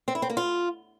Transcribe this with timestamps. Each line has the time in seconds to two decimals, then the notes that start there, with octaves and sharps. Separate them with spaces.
0.08 C4
0.15 E4
0.22 C4
0.30 A#3
0.37 F4